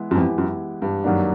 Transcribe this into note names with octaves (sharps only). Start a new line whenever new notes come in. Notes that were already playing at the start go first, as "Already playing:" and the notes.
Already playing: E3 G#3 B3 E4
F#2
F2 E3 G#3 B3 E4 G4
F#2
G2
F#2 D#3 F#3 A#3 D4